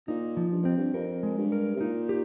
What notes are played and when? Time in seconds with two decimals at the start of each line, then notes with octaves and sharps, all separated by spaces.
0.08 A#2 D#4
0.37 F3
0.52 G2
0.63 F2 C4
0.77 G2
0.94 F2 A#4
1.23 G#3
1.38 G2
1.52 A#4
1.76 C3
1.81 A#2 D#4
2.09 G4